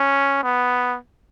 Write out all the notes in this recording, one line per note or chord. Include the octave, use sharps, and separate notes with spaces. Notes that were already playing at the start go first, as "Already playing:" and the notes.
Already playing: C#4
B3